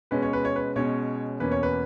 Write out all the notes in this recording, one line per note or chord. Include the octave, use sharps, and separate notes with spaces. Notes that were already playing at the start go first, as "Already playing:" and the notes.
B2 G#3 C#4 B4
C#5
B4
C#5
B4
B2 G#3 C#4 C#5
E2 B2 A#3 C#4 B4
C#5
B4